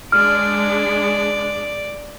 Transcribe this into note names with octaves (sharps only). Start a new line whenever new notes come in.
G#3 D4 D5 F6